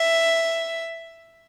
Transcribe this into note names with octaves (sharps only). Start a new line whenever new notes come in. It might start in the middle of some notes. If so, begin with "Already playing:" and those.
Already playing: E5